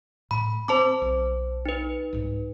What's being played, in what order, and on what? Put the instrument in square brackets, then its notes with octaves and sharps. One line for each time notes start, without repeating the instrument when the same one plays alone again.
[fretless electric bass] A2 [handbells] B5
[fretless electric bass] C4 [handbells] C5 A5 D6
[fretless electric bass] B1
[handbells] D#4 B4
[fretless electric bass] C2 G#2